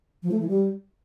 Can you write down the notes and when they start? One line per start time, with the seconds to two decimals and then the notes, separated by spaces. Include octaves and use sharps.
0.23 F3
0.31 A3
0.40 E3
0.48 G3